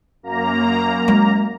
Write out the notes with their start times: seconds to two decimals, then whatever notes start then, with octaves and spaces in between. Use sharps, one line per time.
0.23 F#2 A#3 A#5
1.08 G#3